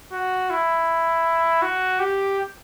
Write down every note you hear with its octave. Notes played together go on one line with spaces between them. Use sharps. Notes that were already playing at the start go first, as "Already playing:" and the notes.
F#4
E4
F#4
G4